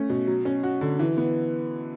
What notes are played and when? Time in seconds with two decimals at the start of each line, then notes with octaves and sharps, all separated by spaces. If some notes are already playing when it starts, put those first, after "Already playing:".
Already playing: A3 C#4
0.10 B2
0.27 F#3
0.45 C#4
0.63 F#4
0.81 D3
0.99 E3
1.17 B3